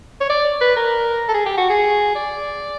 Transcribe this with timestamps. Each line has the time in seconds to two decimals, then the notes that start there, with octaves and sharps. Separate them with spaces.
0.21 C#5
0.30 D5
0.61 B4
0.77 A#4
1.29 A4
1.34 G#4
1.46 G4
1.58 F#4
1.70 G#4
2.16 D5